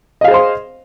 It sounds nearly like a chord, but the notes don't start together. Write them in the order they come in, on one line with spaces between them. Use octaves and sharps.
D#5 F5 G#4 C5 C6